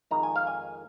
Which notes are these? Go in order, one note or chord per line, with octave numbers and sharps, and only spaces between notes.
F2 D#3 G#3 D#4 A#5
G#5
F5
G#5